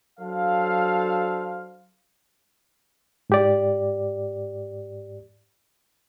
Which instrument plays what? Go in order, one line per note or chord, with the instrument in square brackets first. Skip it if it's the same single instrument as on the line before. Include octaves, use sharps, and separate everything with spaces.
[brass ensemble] F#3 D4 A4 C5 F5
[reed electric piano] G#2 G4 D5